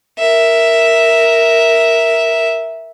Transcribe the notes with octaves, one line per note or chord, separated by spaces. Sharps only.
A#4 E5